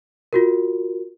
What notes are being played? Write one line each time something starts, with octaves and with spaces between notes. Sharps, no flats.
F4 F#4 A#4